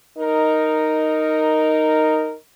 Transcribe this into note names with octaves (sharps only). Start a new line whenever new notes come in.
D#4 A#4